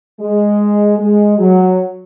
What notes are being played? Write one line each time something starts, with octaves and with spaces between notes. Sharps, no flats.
G#3
G#3
F#3